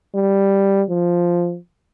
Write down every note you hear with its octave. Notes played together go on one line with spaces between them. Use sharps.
G3
F3